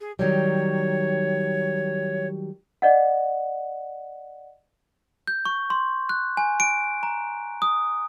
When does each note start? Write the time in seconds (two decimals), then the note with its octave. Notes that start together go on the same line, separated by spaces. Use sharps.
0.01 G#4
0.19 D#3 F#3 G3 C#5
2.82 D5 D#5 F#5
5.27 G6
5.45 C#6
5.70 C6
6.09 F#6
6.37 G#5
6.60 D7
7.03 A#5
7.62 D#6